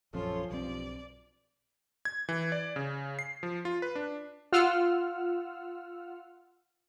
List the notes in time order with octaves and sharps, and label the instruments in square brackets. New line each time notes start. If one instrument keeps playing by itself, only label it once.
[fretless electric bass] A#1 F#2 [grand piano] F3 [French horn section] C#4 A4 [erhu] F4
[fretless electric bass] B1 E3 C4 [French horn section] G2 [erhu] D5
[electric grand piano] G#6
E3
D5
C#3
C7
F3
F4
B4
D4
[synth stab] F4 F#5 E6 F6